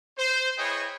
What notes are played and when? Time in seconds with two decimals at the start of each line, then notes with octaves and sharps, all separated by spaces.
0.18 C5
0.57 E4 G#4 B4 C#5 D#5 G5